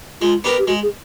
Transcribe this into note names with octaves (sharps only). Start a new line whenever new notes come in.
G#3 F4
B3 D4 G4 A#4
G4
G#3 F#4
G#4